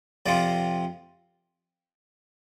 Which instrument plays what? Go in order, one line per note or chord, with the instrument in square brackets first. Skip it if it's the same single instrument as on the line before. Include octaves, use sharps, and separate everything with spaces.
[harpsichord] F2 C3 F3 C4 F4 D5